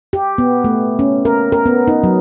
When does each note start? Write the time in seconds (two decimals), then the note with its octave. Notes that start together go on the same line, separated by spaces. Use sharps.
0.13 G4
0.38 B3
0.64 A3
0.99 C#4
1.25 A#4
1.52 A#4
1.66 B3
1.88 D#4
2.04 F#3